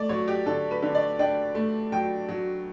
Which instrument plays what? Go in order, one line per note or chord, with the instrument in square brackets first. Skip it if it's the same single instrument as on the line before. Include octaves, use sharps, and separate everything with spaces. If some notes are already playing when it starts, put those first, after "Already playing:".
Already playing: [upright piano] A3 D5
F#3 C#5
G4
D3 A4
B4
D3
D5
D4 G5
A3
F#3 G5
F#3